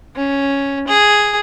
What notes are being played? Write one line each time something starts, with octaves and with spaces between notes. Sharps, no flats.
C#4
G#4